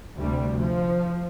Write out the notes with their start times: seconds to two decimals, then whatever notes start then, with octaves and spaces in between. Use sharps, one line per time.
0.19 D2 C3 G3
0.59 F3